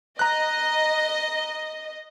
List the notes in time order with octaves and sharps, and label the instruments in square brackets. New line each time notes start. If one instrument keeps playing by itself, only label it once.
[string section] D#5 [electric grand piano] A#5 F#6